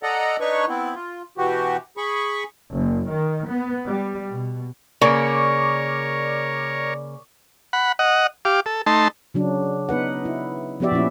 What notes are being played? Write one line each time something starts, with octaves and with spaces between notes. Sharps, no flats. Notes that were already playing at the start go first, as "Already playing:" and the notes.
A4 D5 D#5 F#5 A#5
D4 D#4 B4 C#5 C#6
B3 C4 E4
F4
B2 E3 F#4 G4
G#4 B5 C#6
F#1
D#3
B3
G3
B2
C#3 A#3 A#4 C#5 D5 C#6 D6
F#5 B5
D#5 F#5
G4 F5 D6
A4
A3 D#4 A5 C6
C#3 F#3 D4
B3 D#4 B4 F#5
E4
F3 B3 F#4 G4 D5 E5
A#2 F3 C#4 E4